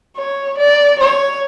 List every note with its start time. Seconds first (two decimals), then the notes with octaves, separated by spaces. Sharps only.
0.17 C#5
0.58 D5
0.99 C#5